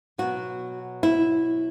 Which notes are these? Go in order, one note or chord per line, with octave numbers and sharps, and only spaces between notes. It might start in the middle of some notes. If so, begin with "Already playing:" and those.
B2 F#3 F#4
E4